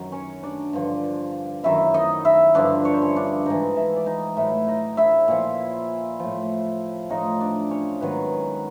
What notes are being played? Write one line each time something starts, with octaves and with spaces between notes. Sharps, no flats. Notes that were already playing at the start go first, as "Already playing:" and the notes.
Already playing: F#2 D#3 F#3
C#4 C#5
D4 D5
G2 D3 F3
F#2 D#3 F#3 E4 E5
D#4 D#5
E4 E5
G2 D3 F3 D4 D5
C#5
C5
C#4 C#5
D4 D5
G#2 E3 D#4 D#5
E4 E5
D5
D#4 D#5
A2 F#3 E4 E5
D#4 D#5
E4 E5
A#2 F3
A2 F3
A2 F3 D#4 D#5
D4 D5
C#4 C#5
G#2 D#3 F#3 B3 B4